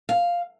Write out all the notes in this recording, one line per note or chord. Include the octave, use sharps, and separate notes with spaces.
F5